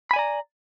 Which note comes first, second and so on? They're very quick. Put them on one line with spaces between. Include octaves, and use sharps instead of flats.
B5 G#5 D5 A#5